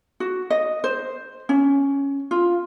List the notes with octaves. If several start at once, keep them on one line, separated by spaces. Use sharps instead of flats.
F#4
D#5
C5
C#4
F4